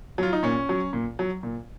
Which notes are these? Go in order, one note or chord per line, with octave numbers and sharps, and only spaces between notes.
F#3 F4
D#4
A#2 C#4
F#3
A#2
F#3
A#2